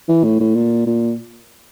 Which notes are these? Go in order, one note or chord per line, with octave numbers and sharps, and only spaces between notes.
E3
A2
A2
A#2
A#2